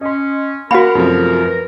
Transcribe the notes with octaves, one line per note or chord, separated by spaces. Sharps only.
C#4 D#5 C6
A#3 F#4 A#4 F5 F#5 G#5 B5
F#2 C3 F3 F#3 A3
B4 A#6